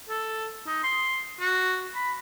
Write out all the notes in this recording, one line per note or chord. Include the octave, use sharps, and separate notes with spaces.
A4
D#4
C6
F#4
B5